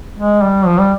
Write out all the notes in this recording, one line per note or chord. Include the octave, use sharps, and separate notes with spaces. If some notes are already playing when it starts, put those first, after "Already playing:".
G#3
G3
F3
G3